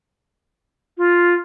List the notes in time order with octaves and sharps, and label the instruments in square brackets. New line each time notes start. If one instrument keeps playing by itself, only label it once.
[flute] F4